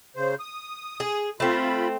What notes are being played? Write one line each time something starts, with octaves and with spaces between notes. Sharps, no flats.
C#3 C5
D#6
G#4
A3 C4 F4 B5